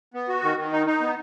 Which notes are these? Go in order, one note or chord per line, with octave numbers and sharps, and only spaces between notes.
B3
F#4
D#3
D#3
D#4
D#4
B3